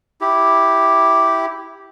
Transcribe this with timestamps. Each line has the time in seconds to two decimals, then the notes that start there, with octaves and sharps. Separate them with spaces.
0.21 E4 G4